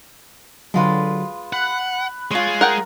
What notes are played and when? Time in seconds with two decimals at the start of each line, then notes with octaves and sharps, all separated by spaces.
0.74 D3 F#3 G#3 F4 B4
1.53 F#5 B5 F#6
2.31 G#3 F4 G#4 C#5
2.61 A#4 F#5 G5